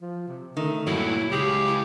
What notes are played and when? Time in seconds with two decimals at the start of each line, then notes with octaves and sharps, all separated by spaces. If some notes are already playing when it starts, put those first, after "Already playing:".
0.02 F3
0.28 C3
0.57 D#3 A3
0.87 G2 A#2 F#3 E4
1.32 C#2 G4 G#4
1.67 E4